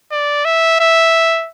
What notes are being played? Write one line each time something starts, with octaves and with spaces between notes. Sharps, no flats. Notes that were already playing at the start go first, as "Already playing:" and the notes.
D5
E5
E5